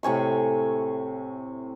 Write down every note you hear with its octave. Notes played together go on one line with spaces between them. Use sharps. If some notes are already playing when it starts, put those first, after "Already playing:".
A2 C3 G#5 C#6